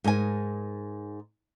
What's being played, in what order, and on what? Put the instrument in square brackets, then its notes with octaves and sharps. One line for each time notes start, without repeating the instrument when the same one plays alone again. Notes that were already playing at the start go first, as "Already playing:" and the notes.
[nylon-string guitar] G#2 A#4 D#5 G#5